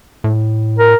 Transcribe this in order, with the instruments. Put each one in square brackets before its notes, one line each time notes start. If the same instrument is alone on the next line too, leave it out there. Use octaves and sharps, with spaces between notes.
[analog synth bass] A2
[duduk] A#4